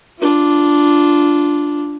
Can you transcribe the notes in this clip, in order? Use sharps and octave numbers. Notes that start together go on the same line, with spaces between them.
D4 F4